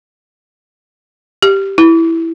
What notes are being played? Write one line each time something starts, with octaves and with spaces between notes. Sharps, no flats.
G4
E4